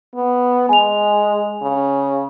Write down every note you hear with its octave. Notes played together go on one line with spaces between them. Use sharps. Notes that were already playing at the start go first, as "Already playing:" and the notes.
B3
G#3 G#5 F7
C#3